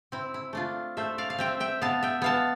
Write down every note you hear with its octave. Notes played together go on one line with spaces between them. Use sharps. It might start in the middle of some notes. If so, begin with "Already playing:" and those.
C4 E4
E4
A3 D4 F4
A3 C5 E5
D5 F5
F5
C4 E5 G5
E5 G5
B3 F5 A5
E5 G5
B3 F5 A5